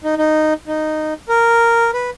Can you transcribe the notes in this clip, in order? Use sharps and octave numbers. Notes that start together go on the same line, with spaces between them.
D#4
D#4
D#4
A#4
B4